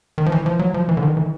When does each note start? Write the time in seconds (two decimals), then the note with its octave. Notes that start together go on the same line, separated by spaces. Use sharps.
0.18 D#3
0.26 F3
0.32 E3
0.46 F3
0.59 F#3
0.74 F3
0.89 E3
0.97 D3
1.03 D#3
1.17 E3